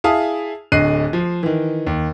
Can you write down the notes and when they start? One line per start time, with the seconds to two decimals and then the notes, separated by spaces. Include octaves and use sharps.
0.04 E4 G#4 F5 A5 D#6
0.72 D1 D2 D#5 F#6 C7 D#7
1.13 F3
1.43 D#3 E3
1.87 D#2